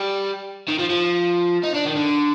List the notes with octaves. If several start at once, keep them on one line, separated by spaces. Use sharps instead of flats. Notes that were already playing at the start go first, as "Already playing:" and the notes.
Already playing: G3
D#3
F3
F3
D#4
D4
D#3
D3